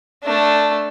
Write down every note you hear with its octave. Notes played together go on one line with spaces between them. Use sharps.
A3 D4